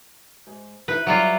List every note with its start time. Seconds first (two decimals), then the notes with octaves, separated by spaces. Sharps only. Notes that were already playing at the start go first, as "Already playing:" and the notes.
0.47 G#2
0.88 D#4 E4 B4 C5
1.07 F#3 G3 F4 E5